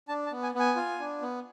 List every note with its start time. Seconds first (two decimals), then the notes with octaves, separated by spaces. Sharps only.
0.08 D4 A5
0.26 A5
0.32 B3
0.43 G#5
0.54 B3
0.60 G#5
0.76 F4
1.00 D4
1.22 B3